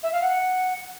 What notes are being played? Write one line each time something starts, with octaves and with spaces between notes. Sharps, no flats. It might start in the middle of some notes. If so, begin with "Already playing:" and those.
E5
F5
F#5